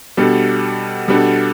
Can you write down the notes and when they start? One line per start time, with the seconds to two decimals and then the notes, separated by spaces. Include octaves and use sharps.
0.17 B2 G3 B3 D4 A4
1.08 B2 G3 B3 D4 A4